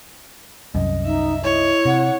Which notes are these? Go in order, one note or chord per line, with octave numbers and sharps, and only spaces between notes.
C2 F#2 D#5
D#4 E5
E4 C#5 D#5
C3 F#5